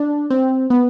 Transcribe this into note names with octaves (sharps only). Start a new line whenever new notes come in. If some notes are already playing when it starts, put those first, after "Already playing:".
Already playing: D4
C4
B3